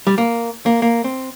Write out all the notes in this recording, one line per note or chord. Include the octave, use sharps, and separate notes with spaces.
G3
A#3
A#3
A#3
C4